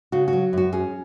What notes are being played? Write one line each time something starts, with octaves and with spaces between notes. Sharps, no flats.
C#3 F#4
F#4
F#3
F#2 F#4
C#4 G#4